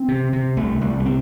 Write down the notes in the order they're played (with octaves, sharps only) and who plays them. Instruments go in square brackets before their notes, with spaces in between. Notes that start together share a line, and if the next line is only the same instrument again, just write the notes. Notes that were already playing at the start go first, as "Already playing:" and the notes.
Already playing: [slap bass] C4
C3
C3
C2 A3
C2 G3
A3
C3 C4